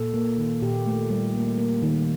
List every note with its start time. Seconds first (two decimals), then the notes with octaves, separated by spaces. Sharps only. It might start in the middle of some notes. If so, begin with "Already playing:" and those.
Already playing: A#2 A4
0.14 A#3
0.38 D#3
0.62 A#2 G4
0.86 A3
1.10 G3
1.34 A#3
1.58 A#3
1.83 D#3